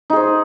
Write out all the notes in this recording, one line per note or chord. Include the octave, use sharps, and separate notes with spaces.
D#4 G#4 C5